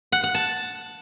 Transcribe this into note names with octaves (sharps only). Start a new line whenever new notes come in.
F#5
F#5
A5